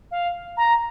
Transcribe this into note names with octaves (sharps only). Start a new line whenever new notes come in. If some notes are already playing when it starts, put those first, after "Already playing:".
F5
A#5